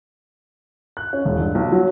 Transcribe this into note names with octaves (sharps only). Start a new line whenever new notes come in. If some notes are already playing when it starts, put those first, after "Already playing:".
F#6
C#4
E1
G2
B1
F#3